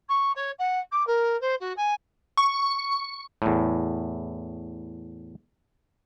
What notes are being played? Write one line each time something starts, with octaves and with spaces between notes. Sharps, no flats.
C#6
C#5
F#5
D6
A#4
C5
F#4
G#5
C#6
E2 A2